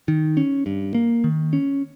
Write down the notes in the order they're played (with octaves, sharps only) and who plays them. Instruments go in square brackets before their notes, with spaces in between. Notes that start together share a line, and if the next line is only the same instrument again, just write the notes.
[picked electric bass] D#3
C#4
G2
A#3
D#3
C#4